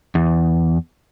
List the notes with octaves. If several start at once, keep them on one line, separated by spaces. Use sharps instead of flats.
E2